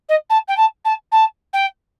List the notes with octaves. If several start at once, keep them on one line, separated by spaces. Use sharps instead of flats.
D#5
A5
G5
A5
A5
A5
G5